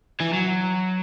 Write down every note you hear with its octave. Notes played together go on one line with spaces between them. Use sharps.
E3
F#3